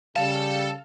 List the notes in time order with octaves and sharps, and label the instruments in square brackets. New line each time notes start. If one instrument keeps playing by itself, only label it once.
[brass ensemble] C#3 G3 [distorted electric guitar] A4 A5 [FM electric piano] F5